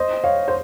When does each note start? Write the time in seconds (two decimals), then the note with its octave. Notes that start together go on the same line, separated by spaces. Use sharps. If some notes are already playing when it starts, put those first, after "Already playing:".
Already playing: C5 D#5
0.24 C#5 F5
0.48 C5